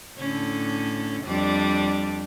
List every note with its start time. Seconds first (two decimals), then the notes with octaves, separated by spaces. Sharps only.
0.18 A2 D3 C#4
1.24 F2 G3 D4